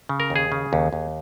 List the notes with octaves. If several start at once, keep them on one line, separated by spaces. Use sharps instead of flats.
C#3
A#4
D#2
G#4
C#3
D#2
D#2